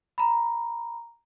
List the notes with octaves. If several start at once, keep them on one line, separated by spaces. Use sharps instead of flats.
A#5 B5